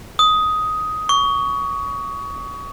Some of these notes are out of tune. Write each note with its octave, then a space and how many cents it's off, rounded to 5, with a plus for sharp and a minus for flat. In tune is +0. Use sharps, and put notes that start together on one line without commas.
D#6 +10
C#6 +25